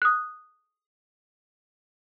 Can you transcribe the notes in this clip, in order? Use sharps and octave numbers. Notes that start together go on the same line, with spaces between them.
D#6 F#6